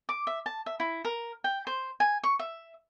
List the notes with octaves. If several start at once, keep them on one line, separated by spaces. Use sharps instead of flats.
D6
E5
A5
E5
E4
A#4
G5
C5
G#5
C#6
E5